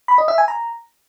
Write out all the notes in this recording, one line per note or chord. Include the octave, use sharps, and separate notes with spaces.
B5
D#5
E5
G#5
A#5